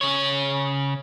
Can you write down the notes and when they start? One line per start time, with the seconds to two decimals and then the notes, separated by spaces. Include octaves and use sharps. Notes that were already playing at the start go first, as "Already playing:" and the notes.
0.01 C#3 C#5